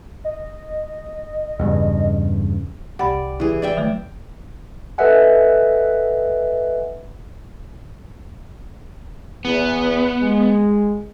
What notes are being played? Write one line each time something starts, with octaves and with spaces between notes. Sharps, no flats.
D#5
E2 G2 C#3
C2 G4 D5 F#5 B5
E3 G#4
D5 E5 G5
D#3 F#3 A3
A4 B4 D#5 E5 F#5 G#5
E2 B3
G#3